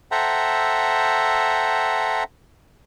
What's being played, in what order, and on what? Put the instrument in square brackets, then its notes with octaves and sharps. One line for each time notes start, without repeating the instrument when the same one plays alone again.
[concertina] A4 C5 E5 F#5 G5 A#5